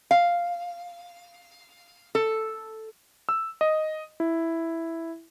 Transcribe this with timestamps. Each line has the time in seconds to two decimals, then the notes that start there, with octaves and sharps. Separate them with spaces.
0.11 F5
2.15 A4
3.29 E6
3.61 D#5
4.20 E4